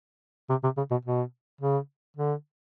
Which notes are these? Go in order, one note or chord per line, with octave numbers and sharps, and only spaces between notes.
C3
C3
C#3
B2
B2
C#3
D3